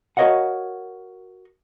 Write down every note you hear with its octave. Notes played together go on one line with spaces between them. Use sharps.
F#4 A#4 C#5 D#5 F5 F#5